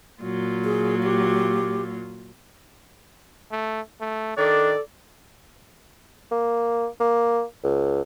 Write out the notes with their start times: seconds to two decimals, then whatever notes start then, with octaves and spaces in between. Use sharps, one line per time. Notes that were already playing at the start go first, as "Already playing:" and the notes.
0.21 A#2 F#3 F4
0.65 G#4
1.03 G4
3.51 A3
4.01 A3
4.38 D#3 D4 A4 D5
6.31 A#3
7.00 A#3
7.64 C#2